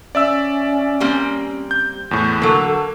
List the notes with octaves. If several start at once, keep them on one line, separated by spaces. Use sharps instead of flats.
C#4 D5 E5 E6
G3 A#3 C4
G6
E2 A2
D3 F#3 A#3 A4